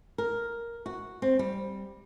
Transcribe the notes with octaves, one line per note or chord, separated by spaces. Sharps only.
A#4
F#4
C4
G3